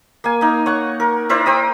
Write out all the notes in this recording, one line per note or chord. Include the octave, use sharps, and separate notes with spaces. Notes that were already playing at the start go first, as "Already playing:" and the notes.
A#3 G#5
A#3 D#4
C#5 F#5 C#6
A#4
E4 A#4 C5 D5
C5 G5 D#6